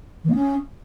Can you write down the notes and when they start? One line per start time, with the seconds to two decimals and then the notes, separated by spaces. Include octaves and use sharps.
0.24 E3
0.29 A#3
0.34 C#4